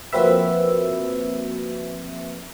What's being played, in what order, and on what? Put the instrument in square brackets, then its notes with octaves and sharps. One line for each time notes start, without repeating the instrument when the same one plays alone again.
[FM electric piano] F3 A#3 C4 F#4 B4 E5